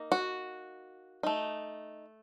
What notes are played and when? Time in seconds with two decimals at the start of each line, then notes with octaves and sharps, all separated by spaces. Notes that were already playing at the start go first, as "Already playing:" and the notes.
Already playing: A#3 D#4
0.12 F#4
1.23 A3 D#4